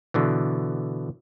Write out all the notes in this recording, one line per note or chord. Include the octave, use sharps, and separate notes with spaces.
B2 D3 E3